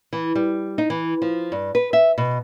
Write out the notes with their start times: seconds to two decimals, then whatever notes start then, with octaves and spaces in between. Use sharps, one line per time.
0.13 E3
0.35 G3
0.78 D#4
0.90 E3
1.22 F3
1.52 G2
1.75 B4
1.93 E5
2.18 B2